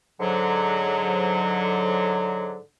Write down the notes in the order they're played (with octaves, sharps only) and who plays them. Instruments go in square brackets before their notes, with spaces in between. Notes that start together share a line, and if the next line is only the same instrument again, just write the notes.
[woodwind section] G#2 D3 F#3